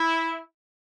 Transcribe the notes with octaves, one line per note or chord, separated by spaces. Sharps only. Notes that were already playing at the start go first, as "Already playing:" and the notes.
Already playing: E4